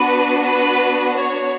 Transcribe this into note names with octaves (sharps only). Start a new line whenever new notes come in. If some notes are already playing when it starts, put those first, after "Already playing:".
Already playing: B3 D4 F#4 B4
B4
C#5